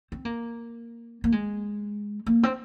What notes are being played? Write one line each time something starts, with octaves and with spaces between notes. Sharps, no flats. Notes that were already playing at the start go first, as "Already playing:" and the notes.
C4
A#3
A#3
G#3
A#3
C4